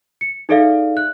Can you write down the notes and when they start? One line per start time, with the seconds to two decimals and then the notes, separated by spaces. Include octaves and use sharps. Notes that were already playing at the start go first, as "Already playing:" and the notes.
0.21 C#7
0.49 D#4 G#4 A4 D5 E5 F5
0.97 F#6